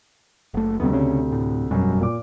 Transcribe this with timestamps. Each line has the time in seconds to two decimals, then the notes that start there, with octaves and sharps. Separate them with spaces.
0.54 F#1 A3
0.80 D2 C3 G3 B3
0.93 C#3 C#4
1.32 A2
1.71 G#1 F#2 B2 G3
2.01 A#2 D6